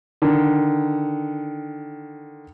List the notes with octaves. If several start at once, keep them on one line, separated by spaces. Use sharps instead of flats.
D3 D#3